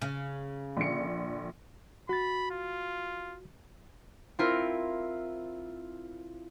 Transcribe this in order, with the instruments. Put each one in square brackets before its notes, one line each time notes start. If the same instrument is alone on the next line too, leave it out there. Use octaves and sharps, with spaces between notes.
[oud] C#3
[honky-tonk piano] A#1 D3 C#7
[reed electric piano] F#4 A6 [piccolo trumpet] B5
[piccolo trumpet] F4
[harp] C4 E4 F4 A#4